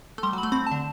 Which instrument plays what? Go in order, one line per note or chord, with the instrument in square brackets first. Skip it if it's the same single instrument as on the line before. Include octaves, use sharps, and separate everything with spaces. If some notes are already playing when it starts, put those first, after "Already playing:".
[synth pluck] A3
[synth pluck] G3 [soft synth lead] C6
[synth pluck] F#3
[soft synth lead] B5
[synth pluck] A3
[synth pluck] C4 [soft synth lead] B5
[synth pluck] D3 [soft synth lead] A5